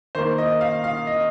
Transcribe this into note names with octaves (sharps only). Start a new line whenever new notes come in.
D#3 A#3 C5
D#5
F5
F5
D#5